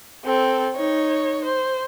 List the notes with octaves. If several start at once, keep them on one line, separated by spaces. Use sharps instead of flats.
C4 A4
D#4 C#5
C5